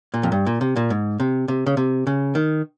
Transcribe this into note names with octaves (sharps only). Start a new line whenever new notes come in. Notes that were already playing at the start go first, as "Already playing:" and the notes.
A#2
F2
G2
A#2
C3
A#2
G#2
C3
C3
C#3
C3
C#3
D#3